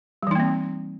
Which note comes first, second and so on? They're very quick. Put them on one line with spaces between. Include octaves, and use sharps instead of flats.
G3 E3 D#4 A#3 C4